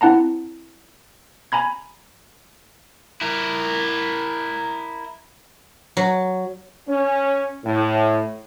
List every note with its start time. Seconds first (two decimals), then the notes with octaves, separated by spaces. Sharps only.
0.01 C4 E4 F#5 A5 A#5
1.52 G#5 A#5 B5 G#6
3.21 E4 A#4
5.97 F#3
6.88 C#4
7.64 A2